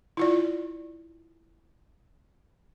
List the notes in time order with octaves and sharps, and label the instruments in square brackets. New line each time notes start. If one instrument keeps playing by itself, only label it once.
[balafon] E4 F4 D5